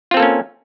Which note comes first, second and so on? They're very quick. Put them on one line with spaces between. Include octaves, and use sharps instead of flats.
F4 C4 A4 A#3 C#4